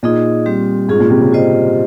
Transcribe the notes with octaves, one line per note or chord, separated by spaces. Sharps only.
A#2 D#4 G#4 D#5
G3 C4 G4
G#2 C#4 F4 G#4
A#2
C3
C#3
G3 F4 C5 D#5